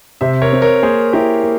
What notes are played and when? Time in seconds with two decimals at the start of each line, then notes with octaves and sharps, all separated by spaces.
0.21 C3 C5 E5
0.42 A#4 C#5
0.52 C4
0.62 A#4 C#5
0.83 A#3 G#4 C5
1.13 E4 G4 A#4
1.43 A#3